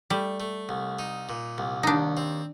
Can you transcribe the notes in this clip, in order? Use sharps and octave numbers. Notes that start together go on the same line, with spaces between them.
G3 A3
A3
C2
D#4
A#2
C2
D#2 D4 D#4
C4